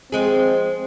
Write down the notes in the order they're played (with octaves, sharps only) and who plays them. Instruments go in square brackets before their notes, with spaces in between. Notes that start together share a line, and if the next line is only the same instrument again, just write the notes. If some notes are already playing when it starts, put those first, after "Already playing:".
[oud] F3 G#3 G#4 [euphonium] C4